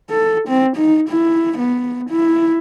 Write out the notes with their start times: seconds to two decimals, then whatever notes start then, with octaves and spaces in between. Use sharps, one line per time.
0.10 A4
0.48 C4
0.77 D#4
1.09 E4
1.58 B3
2.10 E4